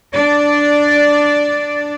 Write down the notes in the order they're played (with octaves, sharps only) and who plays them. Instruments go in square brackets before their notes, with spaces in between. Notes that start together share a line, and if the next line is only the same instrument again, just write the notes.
[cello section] D4 D5